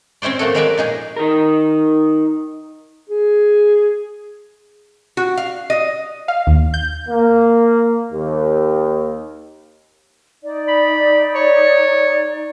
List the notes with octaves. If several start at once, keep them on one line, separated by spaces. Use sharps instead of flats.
C4 C#4 E4 C5 D5
F3 A3 A#3 F#4 A4
F#3 G#3 A#4 B4 D5 E5
A#2 D#4 G#4
D#4 A#4
G#4
F#4
F5
D#5
F5
D#2
G6
A#3
D#2
D#4 D5
B5
C#5